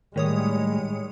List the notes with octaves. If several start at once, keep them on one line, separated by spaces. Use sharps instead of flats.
A2 D#3 G3 G#3 C#5 D#6